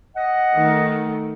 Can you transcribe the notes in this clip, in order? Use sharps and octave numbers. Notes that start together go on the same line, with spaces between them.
D#5 F#5
D#3 A3